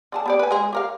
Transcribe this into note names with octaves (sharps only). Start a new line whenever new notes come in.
D3 G#4 A5
B3 G4 D5
B4 G#5
G#3 G#4
G4 A#4 F5